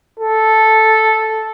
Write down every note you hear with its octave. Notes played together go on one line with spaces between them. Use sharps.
A4